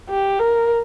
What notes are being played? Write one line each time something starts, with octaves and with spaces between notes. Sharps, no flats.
G4
A#4